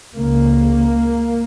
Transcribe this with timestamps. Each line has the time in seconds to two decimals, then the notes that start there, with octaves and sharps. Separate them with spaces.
0.15 C#2 C#3 A#3